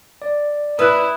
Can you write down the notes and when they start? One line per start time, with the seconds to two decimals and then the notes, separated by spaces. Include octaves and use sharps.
0.22 D5
0.79 E4 B4 D#6 E6 F#6